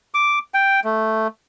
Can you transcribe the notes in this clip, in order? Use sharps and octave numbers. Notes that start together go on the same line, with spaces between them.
D6
G5
A3